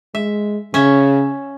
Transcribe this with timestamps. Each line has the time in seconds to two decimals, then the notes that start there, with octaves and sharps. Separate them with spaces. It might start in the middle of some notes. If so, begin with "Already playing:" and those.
0.15 G#3 E5
0.74 C#3 C#4 E5